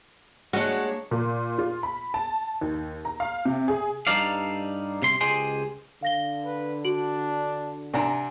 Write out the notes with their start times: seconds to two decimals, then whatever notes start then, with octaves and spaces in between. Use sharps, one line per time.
0.53 G#3 A#3 D4 F#4 C#5
1.11 A#2
1.58 F4
1.83 B5
2.14 A5
2.61 D#2
3.05 A#5
3.20 F5
3.45 C3
3.68 G#4
4.07 G2 G3 D#4 A4 D5 F5
5.02 C3 C6
5.21 C#2 G4 G#4 C5 D#5 C6
6.03 D3 F5 A#6 G7
6.46 B4
6.85 D4 F#4 D7 F#7
7.94 C3 D4 F#5 G#5 A#5